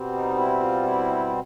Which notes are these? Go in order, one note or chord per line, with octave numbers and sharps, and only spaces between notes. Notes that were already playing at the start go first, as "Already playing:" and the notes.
Already playing: B2 G3 C4
D#4
E4
F4
E4